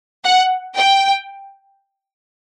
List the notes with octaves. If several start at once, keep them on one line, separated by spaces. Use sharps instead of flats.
F#5
G5